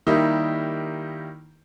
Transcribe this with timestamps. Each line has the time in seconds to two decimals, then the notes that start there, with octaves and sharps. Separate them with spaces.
0.07 D#3 G3 A#3 D#4 E4 G4